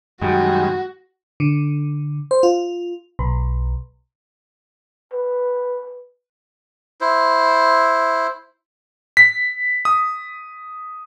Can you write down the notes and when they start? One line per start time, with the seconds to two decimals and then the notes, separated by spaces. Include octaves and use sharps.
0.21 F#2 D#3 G3 G#3 F#4
1.40 D3
2.31 C5
2.43 F4
3.19 B1
5.14 B4
7.01 E4 C5
9.17 B6
9.85 D#6